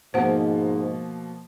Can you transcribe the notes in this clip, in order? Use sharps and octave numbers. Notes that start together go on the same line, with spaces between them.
G#2 B2 F3 A#3 C5 F#5